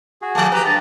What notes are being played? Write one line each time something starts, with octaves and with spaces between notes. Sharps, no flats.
F#4 G#4
F3 A3 A5
G4 B4 A#5
G2 A#5 A6